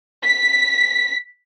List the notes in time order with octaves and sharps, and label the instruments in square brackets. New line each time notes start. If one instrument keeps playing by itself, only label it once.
[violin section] B6